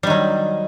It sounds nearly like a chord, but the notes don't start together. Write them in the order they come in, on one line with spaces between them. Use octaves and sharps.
G3 D#3 F#3